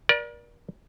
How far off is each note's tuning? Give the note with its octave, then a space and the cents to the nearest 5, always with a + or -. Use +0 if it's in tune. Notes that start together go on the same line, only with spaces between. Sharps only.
A#4 +40 D5 +0